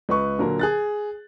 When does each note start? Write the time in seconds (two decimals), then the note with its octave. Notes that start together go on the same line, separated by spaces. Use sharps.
0.09 C#2 B4 C#6
0.39 A#2 D3 F#3 A#4
0.59 G#4 F#6 A6